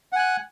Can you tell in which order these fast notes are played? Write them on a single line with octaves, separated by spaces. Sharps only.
F#5 G#5 F#6